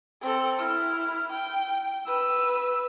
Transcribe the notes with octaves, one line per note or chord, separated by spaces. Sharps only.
C4 A4
E4 F6
G5
B4 E6